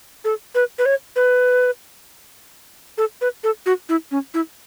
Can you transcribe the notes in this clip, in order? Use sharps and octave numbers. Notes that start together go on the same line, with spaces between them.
A4
B4
B4
C#5
B4
A4
B4
A4
F#4
E4
C#4
E4